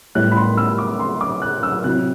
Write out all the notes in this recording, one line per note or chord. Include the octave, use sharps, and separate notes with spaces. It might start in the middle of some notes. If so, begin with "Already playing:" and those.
A2 G3 B3 E4 F#6
B5
C6
E6
D6
C6
D6
F#6
E6
C3 F#3 C4 E4 F#6